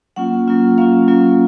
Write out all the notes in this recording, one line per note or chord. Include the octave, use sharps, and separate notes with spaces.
F#3 A#3 C#4 F4 F#5
F#3 A#3 C#4 F4
F#3 A#3 C#4 F4 F5
F#3 A#3 C#4 F4